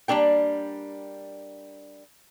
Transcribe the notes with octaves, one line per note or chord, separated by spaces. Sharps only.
G3 A#3 D4 A#4 G5